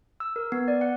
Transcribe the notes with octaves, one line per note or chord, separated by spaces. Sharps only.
E6
A#4
B3
D5
F#5